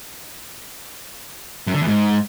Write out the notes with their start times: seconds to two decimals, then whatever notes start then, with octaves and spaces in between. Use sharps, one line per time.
1.67 F#2
1.74 D3
1.81 E2
1.88 G#2